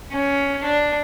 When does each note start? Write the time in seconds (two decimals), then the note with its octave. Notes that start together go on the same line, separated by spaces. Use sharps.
0.12 C#4
0.64 D4